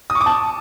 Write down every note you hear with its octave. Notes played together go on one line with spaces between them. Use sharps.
D#6
C#6
D6
A5